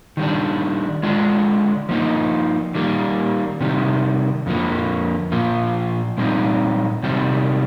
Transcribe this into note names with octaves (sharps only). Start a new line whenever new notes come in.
D#3 G3 D4
D3 G#3 D4 F4
F3 A#3 D#4
D#3 G3 A#3
C3 D#3 G3
F2 D3 F3 A#3
A#2 F3 A#3 F4
A#2 G3 C4 D#4
C3 D#3 G3 C4